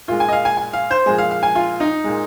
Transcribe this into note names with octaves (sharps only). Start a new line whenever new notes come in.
A#2 G#3 F4
G#5
D#5
F5
G#5
G#5
F5
C5
A#2 F3 G#3 G#4
F5
F5
G#5
F4
D#4
A#2 G#3